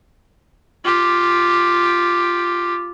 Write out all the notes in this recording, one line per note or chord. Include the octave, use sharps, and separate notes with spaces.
F4 G4